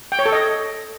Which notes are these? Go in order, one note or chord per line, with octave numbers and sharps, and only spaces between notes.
G5
C#5
A4
D#5